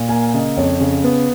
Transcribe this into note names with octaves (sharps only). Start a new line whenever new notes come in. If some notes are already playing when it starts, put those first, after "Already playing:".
Already playing: A#2
A#3 G#5
C#3 D#5
F2 C#5
C#3
B3